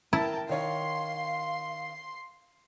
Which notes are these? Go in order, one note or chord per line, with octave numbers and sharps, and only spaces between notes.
E4 A#4 G5 A5
D#3 C#5 F5 C6 C7